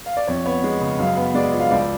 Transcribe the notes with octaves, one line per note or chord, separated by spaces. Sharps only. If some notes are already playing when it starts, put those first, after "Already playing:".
F5
D5
F2 C#5
B3 C#5
G#3
C#3
F#2 F5
B3
G#3 D5
F3
F5
C#2 D5